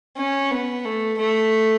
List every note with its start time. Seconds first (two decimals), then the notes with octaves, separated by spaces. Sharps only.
0.17 C#4
0.51 B3
0.85 A3
1.18 A3